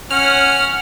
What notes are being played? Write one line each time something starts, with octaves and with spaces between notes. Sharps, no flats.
C#4 F#5 F6